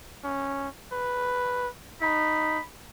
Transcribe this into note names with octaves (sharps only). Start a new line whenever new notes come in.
C#4
B4
D#4 B5